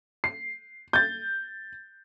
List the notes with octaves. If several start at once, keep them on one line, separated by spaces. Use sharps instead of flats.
C7
G6 A6